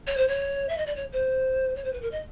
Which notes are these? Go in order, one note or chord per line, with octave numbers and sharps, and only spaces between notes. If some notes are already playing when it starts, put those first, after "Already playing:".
C#5
C5
C#5
E5
D#5
D5
C#5
C5
C#5
C5
B4
A#4
D#5